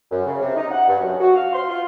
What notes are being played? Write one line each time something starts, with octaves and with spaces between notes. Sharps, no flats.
F#2
C#3
C3
D#4
F#5
G2
F#2
F#4
F5
C6
F4